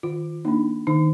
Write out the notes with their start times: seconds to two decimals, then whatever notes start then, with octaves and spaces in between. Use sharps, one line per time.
0.03 D#3 F4
0.45 A#3 D4 D#4
0.87 D#3 D#4